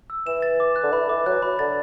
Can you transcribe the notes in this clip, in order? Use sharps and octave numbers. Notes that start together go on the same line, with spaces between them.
E6
E3 E7
A6
D6
F#6
D3
E3 B5
E3 D6
F#3 F#6
B5
D3 A6